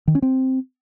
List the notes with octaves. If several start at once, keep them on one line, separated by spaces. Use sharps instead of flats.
D#3
C#4
C4